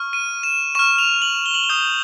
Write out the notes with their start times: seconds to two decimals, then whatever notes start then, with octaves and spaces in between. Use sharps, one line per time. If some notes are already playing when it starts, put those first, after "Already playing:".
Already playing: C#6 F6
0.13 D#7
0.43 E7
0.75 C#6 F6 E7
0.98 F7
1.22 F#7
1.46 G7
1.54 F#7
1.64 G7
1.69 D#6 G6